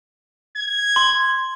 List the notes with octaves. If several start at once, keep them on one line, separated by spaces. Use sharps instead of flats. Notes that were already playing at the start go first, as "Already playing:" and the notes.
G#6
C6